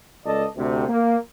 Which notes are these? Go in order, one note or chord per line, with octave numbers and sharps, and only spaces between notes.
C#2 A4 D5 D#5 A5
D2 C3
A#3